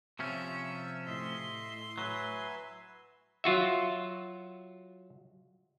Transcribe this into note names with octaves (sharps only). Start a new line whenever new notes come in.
C3 F3 C#4 E5 E6
A2 D#5 E5 C6 E6
F#3 B4 E5 G#5
F#3 F4 F#4 E5